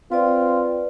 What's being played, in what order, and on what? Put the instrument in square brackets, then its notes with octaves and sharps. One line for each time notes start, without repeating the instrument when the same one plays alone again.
[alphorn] C4 [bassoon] F4 [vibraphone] B4 D5